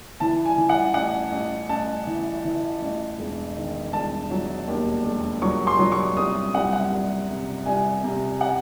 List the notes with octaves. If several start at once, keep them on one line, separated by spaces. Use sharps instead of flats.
E3 A5
G#5
E3
F#5
A1 F#5
A1
A1 A5
E3
E3
A1
E1
D#3
E1 A5
F#3
D#2
E1
F#3 C#6
C6
F#3
C#6
C2 D#6
D#6
C2 F#5
F#5
C2
C3
C2 G#5
C3
F#5